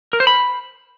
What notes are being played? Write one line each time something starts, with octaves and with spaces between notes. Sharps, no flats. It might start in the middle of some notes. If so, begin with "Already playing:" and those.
A#4
C5
B5